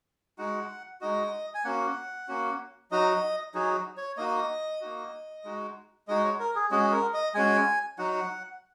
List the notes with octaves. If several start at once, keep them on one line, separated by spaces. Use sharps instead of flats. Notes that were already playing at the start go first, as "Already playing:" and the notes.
G#3 D#4 F#4 F#5
G#3 D#4 F#4 D#5
G#5
A#3 C#4 F#4 F#5
A#3 C#4 F#4
F#3 D#4 F#4 D#5
F#3 D#4 F#4 G#4
C#5
A#3 D#4 F#4 D#5
A#3 D#4 F#4
G#3 D#4 F#4
G#3 D#4 F#4 D#5
C#5
A#4
G#4
G#3 C#4 F#4 G#4
A#4
D#5
G#3 C#4 F#4 G#5
F#3 D#4 F#4 F#5